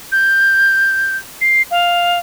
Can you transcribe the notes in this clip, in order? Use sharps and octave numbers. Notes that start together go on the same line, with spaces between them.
G6
C7
F5